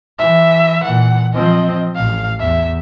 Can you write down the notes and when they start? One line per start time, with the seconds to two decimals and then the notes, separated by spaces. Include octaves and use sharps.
0.19 E3 E5
0.84 A#2 E3 F#5
1.34 F3 C4 D#5
1.96 A1 A2 F5
2.40 E2 E5